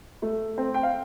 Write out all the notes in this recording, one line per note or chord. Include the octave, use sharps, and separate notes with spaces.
A3
C4
G5
F5